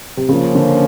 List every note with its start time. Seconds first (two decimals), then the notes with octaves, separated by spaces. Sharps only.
0.17 C3
0.28 C#3 F3 A#3 C#4
0.55 D3